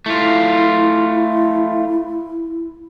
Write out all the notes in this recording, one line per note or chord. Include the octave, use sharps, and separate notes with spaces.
A3 E4 F4